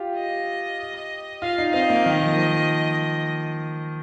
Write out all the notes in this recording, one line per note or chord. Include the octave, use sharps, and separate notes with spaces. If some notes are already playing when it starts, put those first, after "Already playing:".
Already playing: F4 G4
D#5
F4 F5
D#4
C4 D#5
A#3
D#3
F3
F3